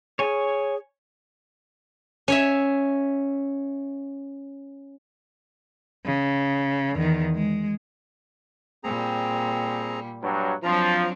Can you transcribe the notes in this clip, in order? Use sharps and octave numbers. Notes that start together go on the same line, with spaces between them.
G#4 C#5 G#5
C#4 C#5 E5
C#3
E2 D#3
G#3
A#2 G3 C4 G#4 A#5
G2 F#3
F3 F#3 C4 D4 F4 A#5